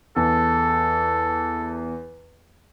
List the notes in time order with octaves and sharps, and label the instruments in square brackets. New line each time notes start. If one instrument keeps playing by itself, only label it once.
[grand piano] E2 [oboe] A4